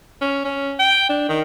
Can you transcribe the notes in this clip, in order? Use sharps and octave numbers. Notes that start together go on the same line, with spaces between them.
C#4
C#4
G5
D4
D#3